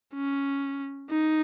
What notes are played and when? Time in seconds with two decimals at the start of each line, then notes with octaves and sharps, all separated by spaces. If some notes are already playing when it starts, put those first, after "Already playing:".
0.15 C#4
1.10 D#4